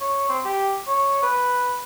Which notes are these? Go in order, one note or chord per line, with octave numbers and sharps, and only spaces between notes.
C#5
C4
G4
C#5
B4